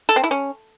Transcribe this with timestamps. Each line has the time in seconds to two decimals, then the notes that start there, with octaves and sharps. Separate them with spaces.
0.09 A4
0.16 C4
0.24 E4
0.31 C#4